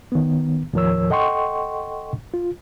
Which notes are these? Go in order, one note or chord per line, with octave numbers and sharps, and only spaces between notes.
D#3 B3
D#2 A2 F3 A#4 C#5 E6
A4 D#5 F#5 G5 C6 C#6
F4